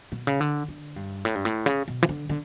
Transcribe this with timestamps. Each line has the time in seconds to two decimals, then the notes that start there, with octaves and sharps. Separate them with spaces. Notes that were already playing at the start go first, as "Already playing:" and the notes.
0.12 B2
0.27 C#3
0.40 D3
0.68 D3
0.96 G2
1.25 A2
1.35 G2
1.45 A2
1.66 C#3
1.88 B2
2.03 E3
2.09 D3
2.29 D3